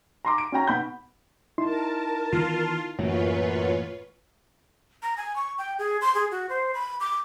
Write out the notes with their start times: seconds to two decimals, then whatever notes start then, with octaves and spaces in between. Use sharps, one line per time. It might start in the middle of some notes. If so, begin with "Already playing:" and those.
0.25 A#5 C6 D6
0.38 D7
0.52 C#4 F#4 G5 A#5
0.67 B2 B5 G6
1.58 D#4 E4 A#4 A5 C6
2.32 D#3 E3 B3 F4
2.99 F#2 A2 E3 A#3 F4 B4 C#5
5.03 A#5
5.17 G#5
5.36 C#6
5.58 G5
5.79 G#4
6.01 C6
6.15 G#4
6.31 F#4
6.50 C5
6.74 B5
7.00 D6